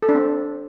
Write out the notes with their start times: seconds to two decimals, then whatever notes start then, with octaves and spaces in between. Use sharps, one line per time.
0.02 A4
0.09 D4
0.15 C4